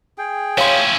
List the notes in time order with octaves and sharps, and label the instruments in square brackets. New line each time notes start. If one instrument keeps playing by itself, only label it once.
[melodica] G#4 G5
[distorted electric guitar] C#4 E4 [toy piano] C#5 C6 [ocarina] F5